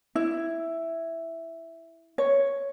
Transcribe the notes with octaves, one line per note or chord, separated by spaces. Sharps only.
E4
C#5